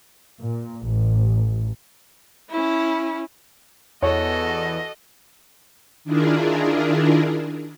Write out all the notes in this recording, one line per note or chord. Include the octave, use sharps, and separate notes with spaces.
A#2
A1
C#4 E4
E2 F#4 A4 C#5 D#5
D#3 D4 E4 F4 G#4 A#4